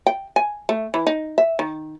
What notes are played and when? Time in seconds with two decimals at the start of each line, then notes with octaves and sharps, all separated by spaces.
0.07 G5
0.36 G#5
0.69 A3
0.94 E3
1.07 D#4
1.38 E5
1.59 D#3